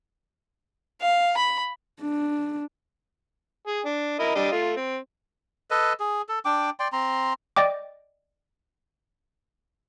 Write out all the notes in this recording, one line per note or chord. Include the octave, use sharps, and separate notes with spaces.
F5
B5
D4
G#4
D4
E4 A#4 D#5
G3 D4 D#5
A3 F4
C4
A4 B4 D#5
G#4
A4
D4 G5 D6
D5 G5 C6
C4 A#5 C6
D5 D#5 G5 D6